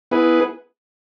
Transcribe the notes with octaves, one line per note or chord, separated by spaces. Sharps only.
B3 E4 G#4 B4